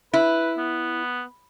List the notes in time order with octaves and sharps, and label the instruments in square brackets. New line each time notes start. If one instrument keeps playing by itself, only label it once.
[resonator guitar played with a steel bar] E4 [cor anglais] B4
[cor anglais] B3